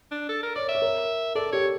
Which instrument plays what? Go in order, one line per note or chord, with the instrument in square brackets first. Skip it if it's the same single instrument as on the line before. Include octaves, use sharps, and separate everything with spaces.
[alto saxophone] D4
A4
A#4
[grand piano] C#5 [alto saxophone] D5
[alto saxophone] E5
[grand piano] C#5
A#4
[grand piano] A4 [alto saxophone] D5
[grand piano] G4 [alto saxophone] C#5